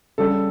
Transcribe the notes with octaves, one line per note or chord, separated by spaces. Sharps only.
C#3 G3 A4